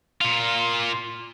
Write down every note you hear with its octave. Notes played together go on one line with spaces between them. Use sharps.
A#2 F4